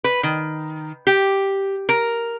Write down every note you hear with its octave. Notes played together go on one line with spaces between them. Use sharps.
B4
D#3
G4
A#4